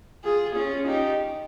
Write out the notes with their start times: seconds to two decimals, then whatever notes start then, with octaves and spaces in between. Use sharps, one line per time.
0.24 F4 G#4
0.55 C#4 F4
0.87 D#4 G4